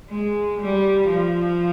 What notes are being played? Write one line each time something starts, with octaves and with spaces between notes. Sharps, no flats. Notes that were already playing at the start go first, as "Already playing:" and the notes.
G#3
G3
F3